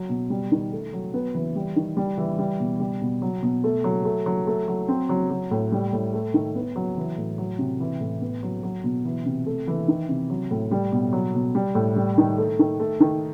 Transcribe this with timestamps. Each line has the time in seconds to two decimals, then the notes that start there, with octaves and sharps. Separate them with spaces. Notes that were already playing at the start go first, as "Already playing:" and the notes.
Already playing: F#3
0.09 B2
0.30 G3
0.52 D#3
0.72 A3
0.93 F#3
1.14 B3
1.35 E3
1.56 G3
1.76 D#3
1.97 G3
2.18 E3
2.39 G3
2.60 B2
2.80 G3
3.02 B2
3.22 F#3
3.43 B2
3.64 A3
3.84 F#3
4.05 A3
4.26 F#3
4.47 A3
4.68 F#3
4.89 C4
5.09 F#3
5.30 F#3
5.51 A2
5.72 G3
5.93 A2
6.14 A3
6.34 D#3
6.55 B3
6.76 F#3
6.97 E3
7.17 A2
7.38 F#3
7.59 C3
7.80 E3
8.01 A2
8.21 B3
8.43 F#3
8.63 F#3
8.84 B2
9.05 E3
9.26 C3
9.46 A3
9.68 E3
9.88 D#3
10.09 C3
10.30 F#3
10.51 A2
10.71 G3
10.92 B2
11.13 F#3
11.34 B2
11.55 G3
11.75 A2
11.96 G3
12.18 D#3
12.38 A3
12.59 D#3
12.80 A3
13.00 D#3